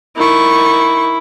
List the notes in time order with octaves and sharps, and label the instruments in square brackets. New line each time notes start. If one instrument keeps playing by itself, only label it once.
[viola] D#3 C#6 [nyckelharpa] E4